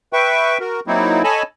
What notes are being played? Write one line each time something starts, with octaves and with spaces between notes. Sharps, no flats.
B4 E5 G5 C#6
F#4 A#4
F#3 A#3 C4 D#4 E4
A4 C#5 D#5 G#5 A5 B5